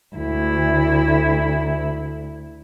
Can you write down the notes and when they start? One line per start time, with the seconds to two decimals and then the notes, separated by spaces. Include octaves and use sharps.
0.15 D2 E4